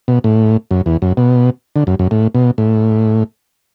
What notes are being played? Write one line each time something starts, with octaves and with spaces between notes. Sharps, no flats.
B2
A2
F#2
E2
F#2
B2
D3
F#2
F#2
A2
B2
A2